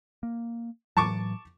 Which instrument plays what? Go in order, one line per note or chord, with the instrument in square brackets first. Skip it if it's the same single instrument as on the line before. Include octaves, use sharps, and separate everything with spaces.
[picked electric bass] A#3
[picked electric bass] A2 E3 F#3 [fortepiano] A5 C#6 D6